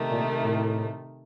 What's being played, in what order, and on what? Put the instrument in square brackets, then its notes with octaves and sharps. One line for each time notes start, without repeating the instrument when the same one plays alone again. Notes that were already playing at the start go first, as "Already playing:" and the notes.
Already playing: [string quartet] C3 D#3 A3 D#4
[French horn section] A#2
A2